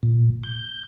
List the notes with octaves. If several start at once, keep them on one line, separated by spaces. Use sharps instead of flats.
A#2
G6